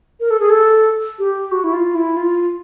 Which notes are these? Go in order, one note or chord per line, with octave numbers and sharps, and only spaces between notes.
A#4
A4
G#4
A4
G4
F#4
E4
F4
E4
F4